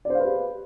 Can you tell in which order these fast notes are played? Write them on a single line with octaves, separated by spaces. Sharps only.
D5 C5 F5 B4 G4